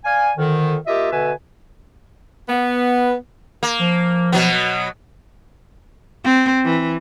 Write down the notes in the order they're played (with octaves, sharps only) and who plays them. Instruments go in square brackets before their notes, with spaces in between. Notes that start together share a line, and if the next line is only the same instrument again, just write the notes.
[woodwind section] D5 F5 G#5
F2 D3 D#3
A#3 F4 G4 D#5 E5
B2 D3 B4 E5 G#5
[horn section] B3
[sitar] A#3
[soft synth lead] F3
[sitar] B2 F#3 B3
[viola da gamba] C4
E3